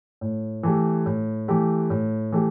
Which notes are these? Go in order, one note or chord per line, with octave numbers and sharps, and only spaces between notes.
A2
E3 A3 G4
A2
E3 A3 G4
A2
E3 A3 G4